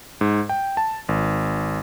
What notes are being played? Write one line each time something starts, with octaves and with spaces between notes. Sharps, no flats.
G#2
G5
A5
G#1